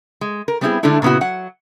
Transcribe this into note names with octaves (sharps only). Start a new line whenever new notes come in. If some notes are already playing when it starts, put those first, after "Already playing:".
G#3
A#4
G3 B3 C4 D#4 E4 G#4
D3 G#3 A3 D4 E4
A#2 C#3 B3 E4 F#4
F#3 F#5